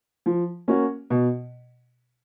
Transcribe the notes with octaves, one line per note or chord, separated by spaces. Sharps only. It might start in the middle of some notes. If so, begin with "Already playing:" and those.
F3
A#3 C#4 F#4
B2